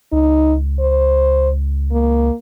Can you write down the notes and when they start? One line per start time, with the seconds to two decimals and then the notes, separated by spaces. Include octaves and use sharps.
0.12 C#2 D#4
0.80 C5
1.92 A#3